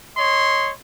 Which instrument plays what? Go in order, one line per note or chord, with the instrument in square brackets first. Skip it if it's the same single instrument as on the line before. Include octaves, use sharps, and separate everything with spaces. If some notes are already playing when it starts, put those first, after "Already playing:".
[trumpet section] C#5 D#5 C6